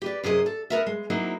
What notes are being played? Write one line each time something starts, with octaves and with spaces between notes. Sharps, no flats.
G4 B4 D5
F#2 C3 G#4 C5 D#5
A4
B3 A#4 E5
G#3
F#3 A#3 C4 D#4 E4